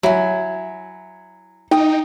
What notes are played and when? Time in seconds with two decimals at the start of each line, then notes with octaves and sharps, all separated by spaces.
0.03 F#3 E4 G#5
1.71 D#4 G5 D#6